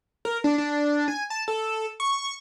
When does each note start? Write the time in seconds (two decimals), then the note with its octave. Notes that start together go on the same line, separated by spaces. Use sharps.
0.25 A#4
0.44 D4
0.58 D4
1.08 G#5
1.30 A5
1.48 A4
2.00 C#6